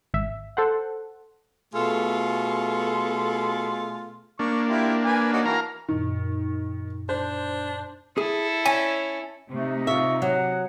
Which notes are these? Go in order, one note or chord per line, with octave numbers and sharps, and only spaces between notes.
G#1 E5
A4 C5 F#5
B2 A3 F4 G#4 A4
A#3 D4 C#6
E4 F4 G4
B4 G#5
D#4 F#4 C#5
E3 F#4 A#4 F5 A5 A#5
F#2 A#2 D#3 D#4
D4 C5
E4 G#4 A4
C#4 G#5
C3 A3 D#4
F4 E5 C#6
F#3 F#5